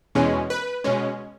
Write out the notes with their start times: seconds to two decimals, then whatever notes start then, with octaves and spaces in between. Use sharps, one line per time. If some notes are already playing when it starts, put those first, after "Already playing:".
0.15 E2 B2 G#3 C#4
0.50 B4
0.84 B2 G#3 C#4